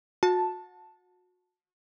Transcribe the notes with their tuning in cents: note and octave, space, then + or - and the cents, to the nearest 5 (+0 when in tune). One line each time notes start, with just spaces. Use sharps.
F#4 -30 A5 +0